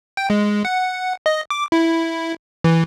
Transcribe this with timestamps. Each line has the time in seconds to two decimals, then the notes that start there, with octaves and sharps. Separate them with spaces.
0.17 G5
0.30 G#3
0.65 F#5
1.26 D#5
1.50 D6
1.72 E4
2.64 E3